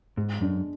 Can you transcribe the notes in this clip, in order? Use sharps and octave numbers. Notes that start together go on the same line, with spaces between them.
G#2 G#3
F#2 D4